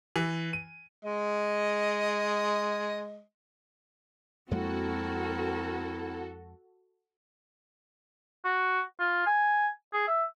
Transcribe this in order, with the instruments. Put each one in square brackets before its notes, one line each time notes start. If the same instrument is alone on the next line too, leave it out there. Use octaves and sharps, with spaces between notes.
[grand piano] E3
D#7
[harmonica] G#3 D#5
[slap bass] F2 G#3 A#3 [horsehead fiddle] C4 A#4 [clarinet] E4 [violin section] F#4 A4
[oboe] F#4
F4
G#5
G#4
E5